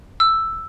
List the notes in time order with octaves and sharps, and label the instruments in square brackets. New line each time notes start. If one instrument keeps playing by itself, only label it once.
[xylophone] E6